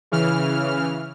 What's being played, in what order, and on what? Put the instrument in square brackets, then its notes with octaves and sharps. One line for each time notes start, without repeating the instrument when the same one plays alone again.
[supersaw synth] C#3 E3 F6